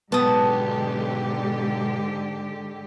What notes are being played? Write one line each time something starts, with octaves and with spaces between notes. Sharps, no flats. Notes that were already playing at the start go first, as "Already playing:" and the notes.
B1 G#2 D3 B3 G4 A5 D#6